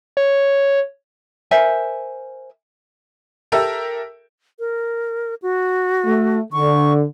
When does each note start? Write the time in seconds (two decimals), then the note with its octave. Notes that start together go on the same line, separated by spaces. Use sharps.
0.17 C#5
1.51 A#4 C5 E5 G#5
3.52 G4 A4 A#4 E5 G5 E6
4.59 A#4
5.42 F#4
6.05 A3
6.52 D3 C#6